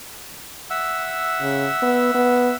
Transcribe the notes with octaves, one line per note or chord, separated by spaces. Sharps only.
E5 F#5 E6
C#3
B3
B3